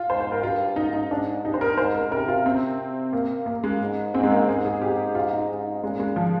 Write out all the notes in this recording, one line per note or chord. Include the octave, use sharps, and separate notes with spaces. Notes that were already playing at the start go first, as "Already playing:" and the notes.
Already playing: F4
G#2 C5
C5
A#4
G2 F4
G#2 D#4
D#4
G#2 D4
G2 D#4
C5
A#4
G#2 C5
A#4
C3 A#4
F4
C4
A#3
A#3
G#3
G#2
G#2 C4
G#3
A#3
G#2 G#4
G#4
G4
F4
D#4
G#2
A#2 G#3
G#3
F3